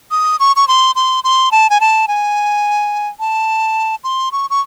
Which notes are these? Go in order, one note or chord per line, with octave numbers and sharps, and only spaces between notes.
D#6
C#6
C#6
C6
C6
C6
A5
G#5
A5
G#5
A5
C6
C#6
C#6